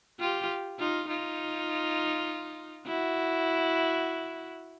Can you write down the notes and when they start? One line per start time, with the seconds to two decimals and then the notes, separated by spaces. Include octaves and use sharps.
0.19 F4 G4
0.79 D#4 F4
1.08 D#4 F4
2.86 E4 F#4